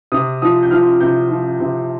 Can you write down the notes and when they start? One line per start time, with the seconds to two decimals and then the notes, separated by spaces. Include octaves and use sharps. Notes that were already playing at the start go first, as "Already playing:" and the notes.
0.12 C3 D#6
0.42 F3 D#6
0.63 G6
0.71 F3 F6
1.00 C3 G6
1.30 F3
1.60 C3